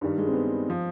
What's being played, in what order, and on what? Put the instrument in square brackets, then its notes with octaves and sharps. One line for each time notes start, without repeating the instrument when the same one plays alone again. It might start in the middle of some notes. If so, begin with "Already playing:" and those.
[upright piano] G2 D#3 G3
G#3
C4
B3
F3